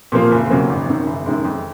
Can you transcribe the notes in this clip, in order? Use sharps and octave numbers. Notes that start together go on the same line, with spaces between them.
A#2 F3 A#3 F4
F#1
F2 C#3 F#3 A#3
G#1
F#2 D#3
F#1
F#2 D#3 G#3
F2